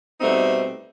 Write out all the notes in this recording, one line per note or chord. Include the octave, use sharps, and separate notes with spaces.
B2 G3 A3 C4 D#4